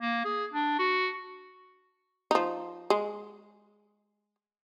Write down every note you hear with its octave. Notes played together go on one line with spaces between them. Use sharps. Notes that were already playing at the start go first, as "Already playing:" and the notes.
A#3
G#4
D4
F#4
F3 D#4
G#3